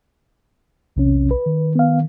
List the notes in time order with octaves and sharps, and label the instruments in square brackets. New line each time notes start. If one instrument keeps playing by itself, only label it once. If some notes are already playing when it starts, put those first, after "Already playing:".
[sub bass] B1 [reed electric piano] E2 C3 C#4
[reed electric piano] B4
[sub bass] D#3
[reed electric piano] B3 F5